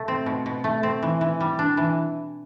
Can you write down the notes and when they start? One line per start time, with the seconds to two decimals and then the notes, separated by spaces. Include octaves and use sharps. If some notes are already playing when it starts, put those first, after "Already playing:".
Already playing: B2 A3
0.08 C4
0.26 B2
0.46 B2
0.64 A3
0.83 C4
1.03 E3
1.21 E3
1.41 G3
1.59 D4
1.77 E3